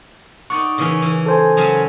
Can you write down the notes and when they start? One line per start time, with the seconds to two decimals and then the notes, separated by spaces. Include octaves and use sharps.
0.50 D#4 D5 F#5 C#6
0.78 C#3 E3 C#4
1.02 E3
1.26 A4 C5 G#5
1.57 C#3 F#3 C#4